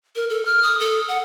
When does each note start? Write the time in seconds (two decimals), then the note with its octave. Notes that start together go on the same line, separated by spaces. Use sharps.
0.16 A#4
0.30 A4
0.45 F6
0.63 D#6
0.80 A4
1.08 F#5